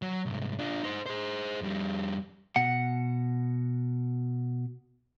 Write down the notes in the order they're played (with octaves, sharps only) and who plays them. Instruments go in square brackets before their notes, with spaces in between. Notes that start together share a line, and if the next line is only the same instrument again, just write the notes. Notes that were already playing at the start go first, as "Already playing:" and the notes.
[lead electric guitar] F#3
C2 G#2
D4 F4
D#4 C5
G#4 C5
F2 G3
[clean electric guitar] B2 F#5